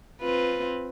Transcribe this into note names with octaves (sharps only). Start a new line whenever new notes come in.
C4 F4 B4